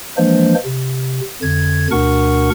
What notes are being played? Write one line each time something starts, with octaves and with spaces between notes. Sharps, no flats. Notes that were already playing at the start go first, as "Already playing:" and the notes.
E3 F3 G#3 A#3 D4 C5
C3
F2 D3 G#6
D2 B2 D4 A#4 F#5 C#6